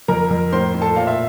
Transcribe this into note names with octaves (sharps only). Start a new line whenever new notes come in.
F2 A#4 A#5
F2
A2 C5 C6
A2
A4 A5
A#2 F5
E5